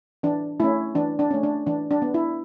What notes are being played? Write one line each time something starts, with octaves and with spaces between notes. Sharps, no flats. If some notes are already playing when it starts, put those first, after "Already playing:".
E3 D4
A3 C#4 E4
E3 D4
D4
A3 C#4
D4
E3 D4
D4
B3
E4